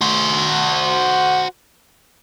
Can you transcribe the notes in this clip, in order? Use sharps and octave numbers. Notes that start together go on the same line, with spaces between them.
F#4 C5